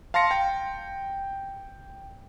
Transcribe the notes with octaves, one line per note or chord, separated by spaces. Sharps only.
F5 A5 C6 A#6 C#7
G5